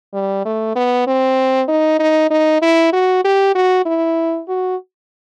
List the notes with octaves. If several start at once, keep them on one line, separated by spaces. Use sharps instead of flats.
G3
A3
B3
C4
D#4
D#4
D#4
E4
F#4
G4
F#4
E4
F#4